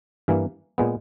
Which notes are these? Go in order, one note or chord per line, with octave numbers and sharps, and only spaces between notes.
G2 E3 A#3
A#2 G#3 B3